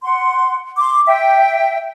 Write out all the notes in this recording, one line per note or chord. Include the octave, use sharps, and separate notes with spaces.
F#5 C6
C6 D6
E5 G5